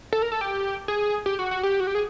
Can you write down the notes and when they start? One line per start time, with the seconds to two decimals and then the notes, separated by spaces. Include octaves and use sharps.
0.13 A4
0.22 A#4
0.32 A4
0.41 G4
0.88 G#4
1.26 G4
1.39 F#4
1.51 F#4
1.63 G4
1.80 F#4
1.87 G4
1.95 G#4